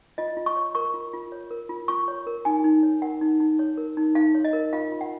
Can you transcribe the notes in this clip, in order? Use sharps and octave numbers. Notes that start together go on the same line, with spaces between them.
F4 D#5
F4
C#6
C#5
A#4 C#6
F4
F4
C#5
A#4
F4
F4 C#6
C#5
A#4
D#4 G#5
D#4
C#5
A#4 F#5
D#4
D#4
C#5
A#4
D#4
D#4 F5
C#5
D#5
A#4
F4 F5
F4
F#5